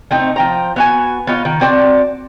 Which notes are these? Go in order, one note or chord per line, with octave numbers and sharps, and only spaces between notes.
A3 C4 D#4
F3 G5 A#5
B3 F#4 G#5
B3 D#4 F4 C#5
D#3
C4 F#4 D5 A5